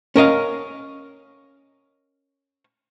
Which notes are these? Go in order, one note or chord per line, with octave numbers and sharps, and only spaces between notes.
C#4 A#4 D#5 F5